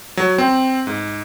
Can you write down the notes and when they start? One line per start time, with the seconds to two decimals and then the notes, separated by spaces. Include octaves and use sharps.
0.17 F#3
0.38 C4
0.87 G#2